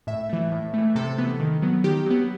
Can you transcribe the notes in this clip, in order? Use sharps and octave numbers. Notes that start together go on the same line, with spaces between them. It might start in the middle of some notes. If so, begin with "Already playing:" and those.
A2 E5
E3 A3
A2
E3 A3
C3 A4
E3 B3
D#3
F#3 B3
D#3 G4
F#3 B3